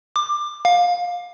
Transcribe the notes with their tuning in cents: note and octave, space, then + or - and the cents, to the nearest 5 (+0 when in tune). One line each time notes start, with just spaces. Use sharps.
D6 +20
F5 +20